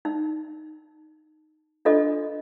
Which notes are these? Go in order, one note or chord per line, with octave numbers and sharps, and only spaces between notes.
D#4
D4 F4 A4 D#5